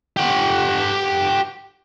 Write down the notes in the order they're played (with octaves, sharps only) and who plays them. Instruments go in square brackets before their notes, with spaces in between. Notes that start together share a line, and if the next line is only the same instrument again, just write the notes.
[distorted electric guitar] G4 F#5